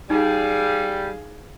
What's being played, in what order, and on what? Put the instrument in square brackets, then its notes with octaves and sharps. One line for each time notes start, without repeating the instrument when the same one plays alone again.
[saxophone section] G3 [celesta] D#4 [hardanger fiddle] G#4 F5